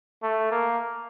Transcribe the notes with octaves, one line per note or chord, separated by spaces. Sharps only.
A3
A#3